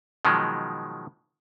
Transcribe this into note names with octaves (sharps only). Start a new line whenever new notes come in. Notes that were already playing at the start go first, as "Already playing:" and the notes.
B2 D#3 F3 F#3 G#3